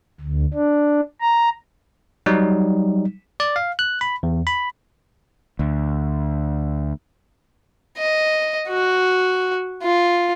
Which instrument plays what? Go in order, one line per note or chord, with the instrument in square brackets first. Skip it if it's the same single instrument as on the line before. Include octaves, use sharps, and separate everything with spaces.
[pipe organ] D2
D4
A#5
[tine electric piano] F#3 G3 D#4
D5
F5
F#6
B5
E2
B5
[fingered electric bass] D2
[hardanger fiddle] D#5
F#4
F4